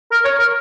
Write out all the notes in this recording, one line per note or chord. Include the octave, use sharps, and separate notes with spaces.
A#4
C#5
A#4